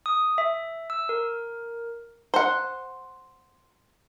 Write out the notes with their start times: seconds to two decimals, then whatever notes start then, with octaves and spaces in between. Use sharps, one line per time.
0.06 D#6
0.38 E5
0.90 E6
1.09 A#4
2.34 C5 F#5